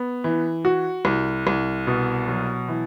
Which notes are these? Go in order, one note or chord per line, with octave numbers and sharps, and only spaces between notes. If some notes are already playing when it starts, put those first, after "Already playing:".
Already playing: B3
E3
F#4
C2
C2
B2
F#3
E3